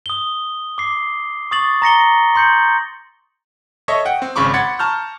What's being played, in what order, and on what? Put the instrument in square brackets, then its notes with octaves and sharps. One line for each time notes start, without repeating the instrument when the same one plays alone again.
[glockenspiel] D#6 G7
D6 C7
C#6 D#6 A6 F#7
A#5 A#6 C#7 G7
C6 G6 C#7
[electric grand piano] A4 C#5 D#5 E5 C#6 D#6
F#5 G5
C4
G#1 C#3 B5 C#6 D6
F#5 B5 C6 G#6 A6 C#7
A5 A#5 C#6 F6 G6